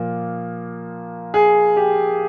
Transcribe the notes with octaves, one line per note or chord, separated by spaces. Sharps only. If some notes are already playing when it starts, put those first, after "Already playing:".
Already playing: A#2 F3 A#3
G#4
G4